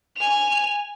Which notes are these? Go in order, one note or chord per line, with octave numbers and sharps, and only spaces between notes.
G#5 F7